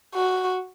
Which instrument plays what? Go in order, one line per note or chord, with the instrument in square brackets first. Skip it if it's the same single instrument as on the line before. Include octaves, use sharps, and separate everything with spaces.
[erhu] F#4